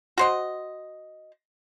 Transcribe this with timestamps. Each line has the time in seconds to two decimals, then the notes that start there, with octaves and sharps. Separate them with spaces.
0.18 F#4 C5 D#5